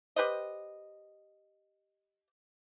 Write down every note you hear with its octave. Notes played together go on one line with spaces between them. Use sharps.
G4 B4 C5 D#5